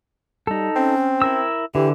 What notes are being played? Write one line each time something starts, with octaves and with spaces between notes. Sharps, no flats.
G3 D#4 A4
C4 C#4
E4 A#4 E6
D3 E3 G4